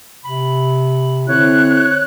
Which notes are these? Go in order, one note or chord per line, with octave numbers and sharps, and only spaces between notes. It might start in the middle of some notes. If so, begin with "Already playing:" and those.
C3 B5
D3 C4 E4 C#5 F#6